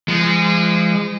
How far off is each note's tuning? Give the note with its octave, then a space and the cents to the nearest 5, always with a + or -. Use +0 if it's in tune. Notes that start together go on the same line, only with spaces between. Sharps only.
F3 -40 G#3 -15